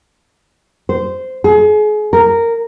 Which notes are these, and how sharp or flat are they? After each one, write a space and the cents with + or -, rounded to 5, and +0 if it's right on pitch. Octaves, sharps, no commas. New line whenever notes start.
C5 -15
G#4 +35
A#4 -10